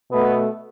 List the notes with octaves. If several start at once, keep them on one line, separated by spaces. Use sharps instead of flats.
B2 A3 B3